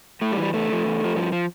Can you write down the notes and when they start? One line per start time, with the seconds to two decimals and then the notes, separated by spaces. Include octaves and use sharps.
0.21 A2 A3
0.32 G3
0.37 E3
0.42 G3
0.54 E2 A3
0.69 D3
0.72 F3
0.85 E2
1.00 D3
1.04 F3
1.16 G2 F3
1.32 F3